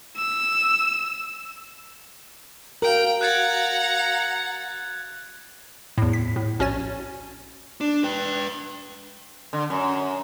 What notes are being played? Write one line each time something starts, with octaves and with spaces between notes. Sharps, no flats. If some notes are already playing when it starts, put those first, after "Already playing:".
E6
F#4 A#4 F5 G5 F#7
F#5 A#5 F#6 G#6 A6
E2 A2
B6
A2
A#1 C#4 F#4 C#5 G#5 A6
D4
B4 G5
D3
F#2